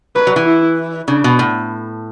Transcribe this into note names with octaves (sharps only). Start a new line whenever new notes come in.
F#3 B4
F#3
E3
E4
C#3 D4
B2
A2